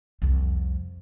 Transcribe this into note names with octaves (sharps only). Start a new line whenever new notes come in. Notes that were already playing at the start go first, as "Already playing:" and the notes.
C2 F2